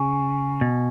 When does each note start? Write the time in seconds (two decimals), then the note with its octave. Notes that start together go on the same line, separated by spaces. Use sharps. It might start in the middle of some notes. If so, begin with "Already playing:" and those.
Already playing: C#3 G#5 C#6
0.61 B2